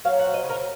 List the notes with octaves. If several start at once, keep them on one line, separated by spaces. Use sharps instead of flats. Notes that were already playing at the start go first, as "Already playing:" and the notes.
F#3 F5
F#5
C4
D#5
C#3
A#4